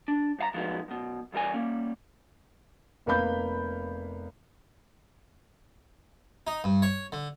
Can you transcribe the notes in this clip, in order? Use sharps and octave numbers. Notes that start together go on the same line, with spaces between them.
D4
G2 F5 A#5
A2 F3 F#3 G#3 B3 D#4
F#2 B2
B1 E2 G3 A#4 G#5
G3 A#3 C#4
F1 A#3 B3 F5 B5 G6
D#4
G2
C#5
D3